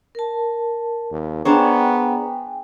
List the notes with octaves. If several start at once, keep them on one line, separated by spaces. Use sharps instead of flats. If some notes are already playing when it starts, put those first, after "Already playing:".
A#4 A5
D#2
B3 D4 G#4 C5 C#5 G5 G#5 A#5